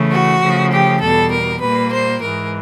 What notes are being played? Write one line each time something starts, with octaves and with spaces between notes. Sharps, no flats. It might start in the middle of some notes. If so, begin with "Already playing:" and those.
Already playing: C#3 E3 A3
F#4
C#3 F3 A3
G4
E2 B2 G3 A4
A#4
A#2 G3 A#3 B4
C5
G#2 E3 G#3 A#4